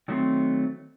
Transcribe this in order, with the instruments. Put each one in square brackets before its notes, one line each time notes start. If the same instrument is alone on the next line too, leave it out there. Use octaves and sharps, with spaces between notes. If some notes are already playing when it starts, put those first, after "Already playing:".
[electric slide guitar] D#3 F#3 A3 C4